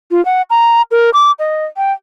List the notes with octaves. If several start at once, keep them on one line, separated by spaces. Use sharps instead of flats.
F4
F#5
A#5
A#4
D6
D#5
G5